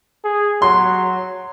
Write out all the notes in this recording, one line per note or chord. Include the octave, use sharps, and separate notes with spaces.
G#4
F#3 C6